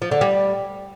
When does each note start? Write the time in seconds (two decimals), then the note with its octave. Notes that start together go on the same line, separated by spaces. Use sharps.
0.02 F3
0.11 D3
0.21 G3